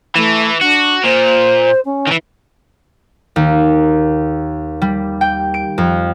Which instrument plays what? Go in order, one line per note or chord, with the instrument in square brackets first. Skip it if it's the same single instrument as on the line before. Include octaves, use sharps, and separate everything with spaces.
[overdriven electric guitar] E3 [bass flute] A3
[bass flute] D4 [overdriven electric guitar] F#4
[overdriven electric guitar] A#2 [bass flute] C5
[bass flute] C#4
[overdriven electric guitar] D#3 E3
[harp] D#2
G3
G5
D7
F2